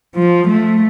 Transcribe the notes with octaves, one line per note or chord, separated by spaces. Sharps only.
F3
A3